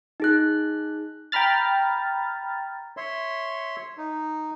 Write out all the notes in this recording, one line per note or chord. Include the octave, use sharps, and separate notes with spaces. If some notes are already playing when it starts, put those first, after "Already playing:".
D#4 G#4 F#6
G5 A#5 B5 F6 A6
C#5 E5 C6
D#4